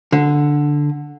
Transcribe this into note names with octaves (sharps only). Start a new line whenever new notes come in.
D3